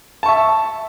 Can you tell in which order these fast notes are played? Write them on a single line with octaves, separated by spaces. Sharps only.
A5 C#6 E5